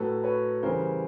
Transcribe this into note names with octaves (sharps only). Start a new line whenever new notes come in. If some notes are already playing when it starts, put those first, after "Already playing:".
Already playing: A2 F#3 A4 B4
B4 C#5
C#3 E3 G3 A#4 C5